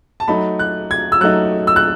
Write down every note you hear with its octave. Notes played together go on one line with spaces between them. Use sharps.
A5
F#3 A3 D#4 B5
F#6
G#6
E6
F#3 A3 D#4 F#6
E6
F#6